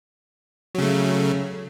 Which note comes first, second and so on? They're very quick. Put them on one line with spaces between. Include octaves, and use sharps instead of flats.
F#3 C#3 A3